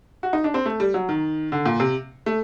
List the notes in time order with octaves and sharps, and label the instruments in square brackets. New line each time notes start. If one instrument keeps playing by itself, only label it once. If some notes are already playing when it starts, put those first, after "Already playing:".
[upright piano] F#4
D#4
D4
C4
A3
G3
F#3
D#3
D3
A#2
C3
A3